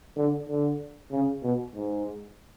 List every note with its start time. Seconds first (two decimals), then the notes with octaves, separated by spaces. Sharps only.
0.17 D3
0.49 D3
1.12 C#3
1.43 B2
1.75 G#2